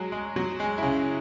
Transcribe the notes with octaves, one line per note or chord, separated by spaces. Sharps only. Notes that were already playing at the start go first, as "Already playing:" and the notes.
Already playing: F#3 G#3 F#4 G#4
G#3 G#4
F#3 F#4
G#3 G#4
E4
C#3 C#4